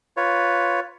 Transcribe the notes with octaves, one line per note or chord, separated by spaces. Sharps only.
F4 B4 C#5